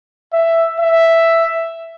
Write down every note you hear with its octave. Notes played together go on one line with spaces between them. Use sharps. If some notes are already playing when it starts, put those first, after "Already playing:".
E5
E5